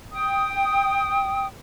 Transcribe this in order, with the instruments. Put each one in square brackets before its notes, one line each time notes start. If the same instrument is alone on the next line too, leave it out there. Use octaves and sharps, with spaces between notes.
[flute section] G5 D#6